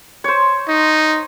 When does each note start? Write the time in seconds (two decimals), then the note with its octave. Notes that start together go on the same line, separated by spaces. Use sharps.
0.24 C5 C#5
0.68 D#4